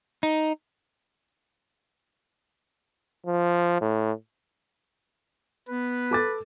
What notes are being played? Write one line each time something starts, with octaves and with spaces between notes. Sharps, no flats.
D#4
F3
A2
B3 B4
A4 D6 A6